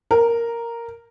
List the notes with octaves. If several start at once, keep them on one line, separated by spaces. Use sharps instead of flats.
A#4